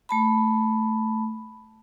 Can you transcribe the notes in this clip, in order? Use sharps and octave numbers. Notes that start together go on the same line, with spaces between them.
A3 A5 B5